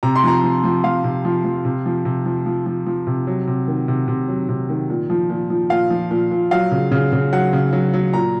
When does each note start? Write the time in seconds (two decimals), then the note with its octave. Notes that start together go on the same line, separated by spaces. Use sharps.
0.03 C3 A#5
0.15 C6
0.24 F3 A#5
0.44 F3
0.64 F3
0.84 F3 F5
1.04 C3
1.25 F3
1.45 F3
1.65 C3
1.86 F3
2.05 C3
2.26 F3
2.46 F3
2.66 F3
2.86 F3
3.07 C3
3.27 F#3
3.47 C3
3.68 D#3
3.88 C3
4.08 C3
4.28 F#3
4.49 C3
4.69 D#3
4.89 A#2
5.10 F3
5.29 A#2
5.50 F3
5.70 A#2 F5
5.90 F3
6.11 A#2
6.31 A#2
6.51 F#3 F5
6.72 C#3
6.92 C#3
7.12 C#3
7.33 F#3 F#5
7.53 C#3
7.73 F#3
7.94 F#3
8.13 A#2 A#5